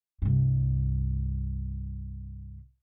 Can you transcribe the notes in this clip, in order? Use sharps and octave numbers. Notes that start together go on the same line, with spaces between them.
C2 G2